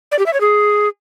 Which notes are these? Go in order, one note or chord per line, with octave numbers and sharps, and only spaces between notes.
D5
G4
E5
C#5
G#4